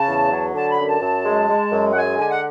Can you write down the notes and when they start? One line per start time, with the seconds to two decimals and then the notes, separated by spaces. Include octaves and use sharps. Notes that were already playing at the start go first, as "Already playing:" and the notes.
Already playing: C#3 A5
0.08 E2
0.31 F#3
0.54 D3 A5
0.70 B5
0.78 F#2
0.86 A5
1.02 F#2
1.25 G#3
1.48 G#3
1.71 F#2
1.91 F#5
1.95 G#3 G#5
2.18 D3 G#5
2.30 F#5